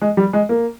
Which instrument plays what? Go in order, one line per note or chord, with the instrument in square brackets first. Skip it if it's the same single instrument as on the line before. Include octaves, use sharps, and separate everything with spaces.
[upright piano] G#3
G3
G#3
A#3